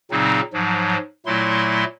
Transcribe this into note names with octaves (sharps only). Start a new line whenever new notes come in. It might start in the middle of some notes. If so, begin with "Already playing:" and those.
A#2 C#3 F#3 C4 D#4
G#2 F3 F#3
A#2 F#3 A3 E4 C6